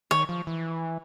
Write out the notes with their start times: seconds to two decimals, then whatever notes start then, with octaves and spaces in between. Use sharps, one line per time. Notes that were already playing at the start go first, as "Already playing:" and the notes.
0.11 D#3 C#5
0.29 F3
0.47 E3